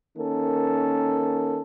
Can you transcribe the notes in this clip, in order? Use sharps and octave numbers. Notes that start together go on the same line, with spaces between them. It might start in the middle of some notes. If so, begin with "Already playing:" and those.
D#3 A#3 C#4 A4